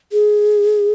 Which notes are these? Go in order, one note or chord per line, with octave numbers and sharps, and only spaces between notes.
G#4